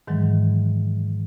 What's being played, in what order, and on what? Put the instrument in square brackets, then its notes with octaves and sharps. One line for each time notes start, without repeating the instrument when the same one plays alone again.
[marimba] G#2 D#3 E3 F#3 G#3